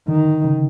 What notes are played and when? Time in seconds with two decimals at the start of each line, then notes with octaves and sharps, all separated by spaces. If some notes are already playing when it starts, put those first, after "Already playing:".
0.08 D3 D#3
0.44 C#3